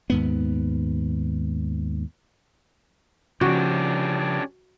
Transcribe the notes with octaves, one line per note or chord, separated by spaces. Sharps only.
D#2 G#2 B3
C#3 F3 C#4 D4 F#4 G4